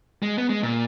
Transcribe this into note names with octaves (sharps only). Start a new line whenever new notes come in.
G#3
B3
G#3
A#2